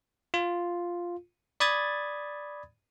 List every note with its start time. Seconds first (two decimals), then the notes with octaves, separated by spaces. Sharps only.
0.34 F4
1.60 D5 B5 D#6 G#6 A6